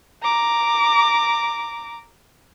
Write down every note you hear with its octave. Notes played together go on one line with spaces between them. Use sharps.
A#5 D6